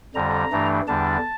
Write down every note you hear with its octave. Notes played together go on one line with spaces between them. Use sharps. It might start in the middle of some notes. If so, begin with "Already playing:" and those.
F2 D3 G3 A#5
G2 E3 A3 D4
E2 D3 G3 D4 A5